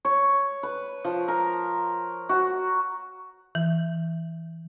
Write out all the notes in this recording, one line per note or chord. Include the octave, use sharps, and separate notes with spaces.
C#5
B4
F3
A#4
F#4
E3